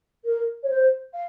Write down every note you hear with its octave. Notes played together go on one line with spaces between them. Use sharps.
A#4
C#5
C5
F5